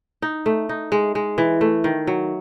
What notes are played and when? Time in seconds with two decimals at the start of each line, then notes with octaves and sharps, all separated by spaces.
0.22 D#4
0.46 A3
0.69 D#4
0.92 G#3
1.15 G#3
1.38 E3
1.61 A3
1.84 D#3
2.07 F#3